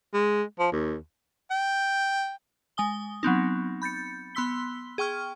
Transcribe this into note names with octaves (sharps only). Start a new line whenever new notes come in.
G#3
F3
D#2
G5
G#3 G#5 D#6 G7
F#3 B3 C4 D#4
B5 G6 A6 C#7
B3 B5 C6 E6 B6 G7
G#4 G5 C#6 F6